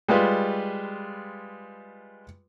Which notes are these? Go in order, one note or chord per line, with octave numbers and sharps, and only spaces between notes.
G3 G#3 F4 B4